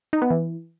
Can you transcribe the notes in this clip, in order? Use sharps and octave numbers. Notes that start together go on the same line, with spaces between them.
D#4
B3
E3